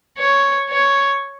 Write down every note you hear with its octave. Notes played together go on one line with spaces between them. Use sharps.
C#5
C#5